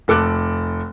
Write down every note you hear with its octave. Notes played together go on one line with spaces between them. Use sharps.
F1 A4 D6 F#6